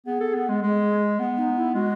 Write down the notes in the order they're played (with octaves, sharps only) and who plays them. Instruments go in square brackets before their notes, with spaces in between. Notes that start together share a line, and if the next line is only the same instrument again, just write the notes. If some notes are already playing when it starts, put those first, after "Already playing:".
[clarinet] B3 [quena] G#4
[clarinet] A4
B3
G#3
[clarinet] G#3 [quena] G#4
[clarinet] B3
[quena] D#4
E4
[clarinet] G#3 [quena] F#4